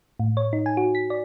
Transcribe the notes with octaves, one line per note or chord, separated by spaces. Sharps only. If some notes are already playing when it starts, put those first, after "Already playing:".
A2
C#5
D#4
G#5
F#4
B6
D5